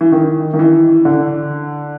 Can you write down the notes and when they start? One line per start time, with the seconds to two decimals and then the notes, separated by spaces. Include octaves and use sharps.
0.01 E3
0.12 D#3
0.54 D#3
0.59 E3
1.05 D3